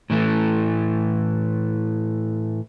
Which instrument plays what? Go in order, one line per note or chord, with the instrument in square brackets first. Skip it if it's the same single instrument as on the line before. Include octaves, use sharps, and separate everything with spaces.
[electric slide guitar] A2 E3 A3